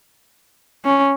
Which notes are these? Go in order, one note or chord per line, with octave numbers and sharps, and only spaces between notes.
C#4